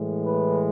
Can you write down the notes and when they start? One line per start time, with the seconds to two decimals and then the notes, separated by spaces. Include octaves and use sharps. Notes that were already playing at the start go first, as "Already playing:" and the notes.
Already playing: A2 E3 G#3
0.25 B4